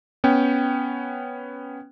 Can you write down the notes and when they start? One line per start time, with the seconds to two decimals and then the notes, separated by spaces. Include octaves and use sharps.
0.24 B3 C#4 G5